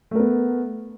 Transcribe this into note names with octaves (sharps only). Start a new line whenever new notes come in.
A3 B3 A#4